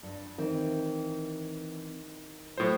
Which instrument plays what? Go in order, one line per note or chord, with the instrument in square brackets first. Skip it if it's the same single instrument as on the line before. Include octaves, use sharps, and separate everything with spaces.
[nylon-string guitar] G2
[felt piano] D#3 [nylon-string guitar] E3 C4
[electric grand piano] A2 C5 [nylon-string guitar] F#3 B3 F4